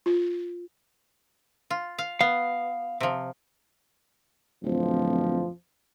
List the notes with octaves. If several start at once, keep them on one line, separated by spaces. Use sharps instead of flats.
F4
F4
F5
B3 F5
C3 F3
D1 F2 B2 F3